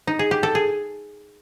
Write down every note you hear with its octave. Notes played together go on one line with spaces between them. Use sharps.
D#4
G#4
G4
A4
G#4